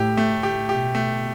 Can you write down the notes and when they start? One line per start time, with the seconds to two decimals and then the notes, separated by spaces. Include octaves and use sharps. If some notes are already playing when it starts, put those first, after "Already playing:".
Already playing: A2 G4
0.17 A3
0.43 G4
0.69 B2 G4
0.95 A3